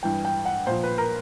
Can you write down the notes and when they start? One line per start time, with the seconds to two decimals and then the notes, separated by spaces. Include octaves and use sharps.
0.03 G2 E3 G5
0.25 G5
0.45 F#5
0.67 A#2 F3 C5
0.83 B4
0.98 A#4